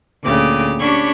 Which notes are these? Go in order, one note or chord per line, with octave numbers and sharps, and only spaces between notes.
D2 A#2 C#3 G4 D6
C#4 D4 G4 B5 C#6 G#6